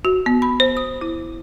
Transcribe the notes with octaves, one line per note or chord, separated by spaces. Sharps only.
F#4
B3
B5
C5
D#6
E4